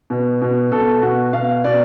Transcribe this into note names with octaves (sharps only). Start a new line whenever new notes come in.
B2
B2
B2 A4
B2 F#4
B2 F5
B2 D5